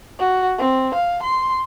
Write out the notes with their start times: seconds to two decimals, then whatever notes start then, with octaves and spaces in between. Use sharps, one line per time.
0.19 F#4
0.59 C4
0.95 F5
1.23 C6